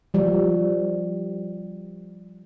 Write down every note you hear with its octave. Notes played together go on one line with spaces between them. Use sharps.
F3 G3